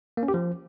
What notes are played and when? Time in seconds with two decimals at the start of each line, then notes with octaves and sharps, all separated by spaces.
0.17 A#3
0.23 C#4
0.28 G4
0.34 F3